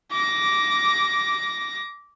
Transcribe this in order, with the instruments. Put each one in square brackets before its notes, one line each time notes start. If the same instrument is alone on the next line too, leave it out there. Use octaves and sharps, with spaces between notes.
[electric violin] D6 A#6